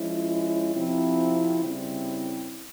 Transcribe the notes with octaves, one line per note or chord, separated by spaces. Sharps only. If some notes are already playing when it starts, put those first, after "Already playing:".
Already playing: F3 G#3 C#4 E4
C3 F3 C4 E4
C#3 G3 C4 E4